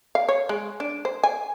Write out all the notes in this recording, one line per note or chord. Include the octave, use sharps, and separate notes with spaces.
F5
C#5
G#3
D4
C5
G#5